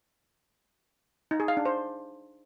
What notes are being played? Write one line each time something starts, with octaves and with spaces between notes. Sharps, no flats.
D#4
G#4
F5
D4
C5